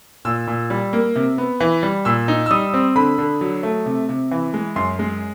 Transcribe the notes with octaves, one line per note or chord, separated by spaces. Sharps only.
A#2 E6
A#2
G3
A#3
C3
B3
E3
G3
A#2 E6
D#4
E6
G3 D#6
C4
D3 B5
D3
F#3
A3
C3
C3
E3
G#3
F#2 C6
G#3